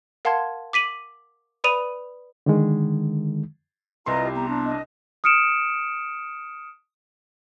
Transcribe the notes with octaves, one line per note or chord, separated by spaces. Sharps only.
A#4 F5 F#5 A5 C6 G#6
D6 B6 D#7 F#7
B4 D5 B5 D#6 D#7 F7
D3 D#3 G#3
C2 E4 F4 B4 D#5 A#5 C6
G4
B3 A#5
D4
D#5
D#6 F6 C#7 D7 E7